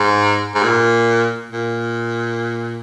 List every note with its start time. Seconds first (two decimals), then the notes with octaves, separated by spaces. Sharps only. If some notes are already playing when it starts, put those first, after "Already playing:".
Already playing: G#2
0.55 G#2
0.63 A#2
1.53 A#2